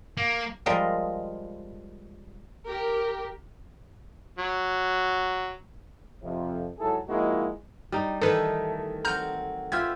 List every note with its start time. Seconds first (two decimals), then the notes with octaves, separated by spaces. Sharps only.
0.17 A#3
0.66 F3 G3 G#3 A#4 D#5
2.66 G4 A#4
4.38 F#3
6.22 F2 C3
6.78 G#2 F#3 E4 G#4 A4
7.09 F3 G#3 A#3 D#4 E4 F#4
7.92 G3 D#4
8.22 D#3 E3 A3 D#4 A4 B4
9.05 F#3 C4 A#5 F6 G6
9.72 C4 F4 G4 B4 E5 G#6